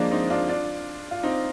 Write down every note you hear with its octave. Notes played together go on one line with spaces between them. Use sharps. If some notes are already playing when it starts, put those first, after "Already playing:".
Already playing: F3 G#3 A#3 D4
C4 D#4
D4 F4
D4 F4
F4
C4 D#4